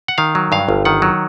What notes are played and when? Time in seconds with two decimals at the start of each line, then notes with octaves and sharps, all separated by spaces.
0.08 F#5
0.18 D#3 F5
0.35 F#3
0.52 G2 F5
0.69 G1
0.85 D#3 F#5
1.02 F#3